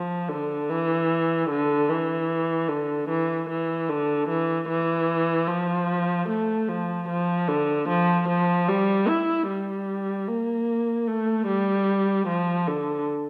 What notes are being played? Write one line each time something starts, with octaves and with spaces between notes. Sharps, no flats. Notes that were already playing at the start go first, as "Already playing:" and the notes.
Already playing: F3
D3
E3
D3
E3
D3
E3
E3
D3
E3
E3
F3
A3
F3
F3
D3
F3
F3
G3
E4
G3
A#3
A3
G3
F3
D3